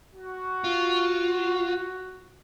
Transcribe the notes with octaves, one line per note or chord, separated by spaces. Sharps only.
F#4
F4